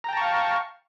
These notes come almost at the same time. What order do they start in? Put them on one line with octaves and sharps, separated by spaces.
A#5 G5 A5 C#6 F5